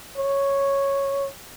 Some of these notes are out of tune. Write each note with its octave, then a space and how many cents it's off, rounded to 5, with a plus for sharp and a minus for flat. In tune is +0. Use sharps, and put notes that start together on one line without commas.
C#5 -5